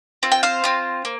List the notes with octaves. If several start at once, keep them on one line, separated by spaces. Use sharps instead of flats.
C4 F4
G5
C5 F5
C4 F4
A#3